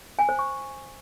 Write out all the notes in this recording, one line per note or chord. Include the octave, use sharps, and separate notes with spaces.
G#5
C5
C#6